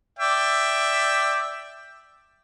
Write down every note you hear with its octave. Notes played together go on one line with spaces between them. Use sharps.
D5 E5 G5